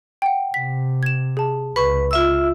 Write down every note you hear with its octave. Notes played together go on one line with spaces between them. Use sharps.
F#5 G5
C3 B6
G#6 E7
G#4 A5
C#2 B4 B5 C#6
F4 E5 E6